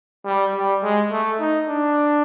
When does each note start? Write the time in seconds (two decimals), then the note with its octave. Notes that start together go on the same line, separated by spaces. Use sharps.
0.25 G3
0.55 G3
0.82 G#3
1.11 A3
1.40 D#4
1.68 D4